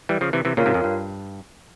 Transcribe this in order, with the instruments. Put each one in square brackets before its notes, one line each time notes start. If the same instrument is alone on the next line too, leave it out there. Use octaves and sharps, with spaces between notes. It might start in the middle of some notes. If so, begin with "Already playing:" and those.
[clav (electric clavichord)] E3 G3
C#3 F3
C3 E3
C3 E3
[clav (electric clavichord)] A#2 C#3 [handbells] F4 A#4 C#5 F5
[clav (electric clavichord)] G#2 C3
F2
G2